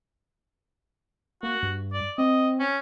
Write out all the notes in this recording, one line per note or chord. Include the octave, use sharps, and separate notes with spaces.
A#3 F#4
G2
D5
C4 D#5
C#4